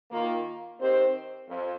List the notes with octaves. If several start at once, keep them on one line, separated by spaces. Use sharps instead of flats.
D#3 A#3 F4
D#3 C4 G4 C5
F2